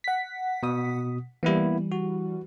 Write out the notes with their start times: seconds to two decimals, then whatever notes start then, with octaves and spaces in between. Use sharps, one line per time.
0.04 F#5 B6
0.63 B2 D#6
1.43 E3 G3 A#3 B3 E4
1.92 F#4